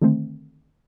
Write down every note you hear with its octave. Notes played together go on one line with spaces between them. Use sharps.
D3 D#3 A3 C4